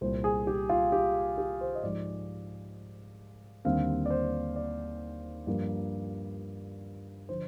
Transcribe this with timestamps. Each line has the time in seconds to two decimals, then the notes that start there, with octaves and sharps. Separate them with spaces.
0.01 C2 A#2 G3 C5
0.24 G#4
0.47 G4
0.69 F4
0.92 G4
1.38 G4
1.61 C5
1.75 D#5
1.83 G#2 F3 G#3 D5
3.65 D#2 D3 G3 C4 F5
4.06 D5
4.11 C5
4.56 D5
5.47 G2 F3 A#3
7.29 D3 F3 C5